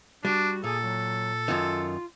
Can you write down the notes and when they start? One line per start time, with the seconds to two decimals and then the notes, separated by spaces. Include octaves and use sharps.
0.25 G3 D4 F#4
0.64 A#2 G#4 A4
0.82 F#3
1.48 F#2 D#3 F4